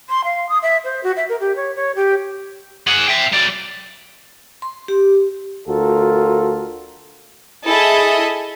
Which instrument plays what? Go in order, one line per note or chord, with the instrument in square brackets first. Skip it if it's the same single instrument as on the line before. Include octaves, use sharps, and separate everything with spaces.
[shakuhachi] C6
F5
D#6
E5
C5
F#4
E5
A#4
G4
C#5
C#5
G4
[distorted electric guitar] G#4 F#5
E5 G5
F#3 D5
[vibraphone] C6
G4
[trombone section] D2 F4 F#4 A4 A#4
[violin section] E4 G#4 A4 D#5 E5 A5